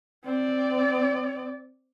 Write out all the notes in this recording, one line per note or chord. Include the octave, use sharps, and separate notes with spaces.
C4 D5